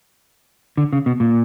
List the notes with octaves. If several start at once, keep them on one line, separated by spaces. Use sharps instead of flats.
D3
C#3
B2
A#2